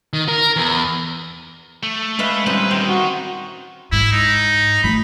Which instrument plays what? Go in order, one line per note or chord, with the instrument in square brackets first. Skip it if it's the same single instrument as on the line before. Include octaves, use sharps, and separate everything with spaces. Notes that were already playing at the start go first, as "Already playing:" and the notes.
[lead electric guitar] D#3
A#4
E2
[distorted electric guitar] A3
[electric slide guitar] G#3 [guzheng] B4 E5 F5
[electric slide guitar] G3 C#4 [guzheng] C4 D#4 E4 [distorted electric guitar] B4
[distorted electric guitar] D#3 [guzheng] C5
[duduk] F#4
[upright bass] G#2 [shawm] E4
[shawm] D#4
[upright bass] F3 A3 [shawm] B5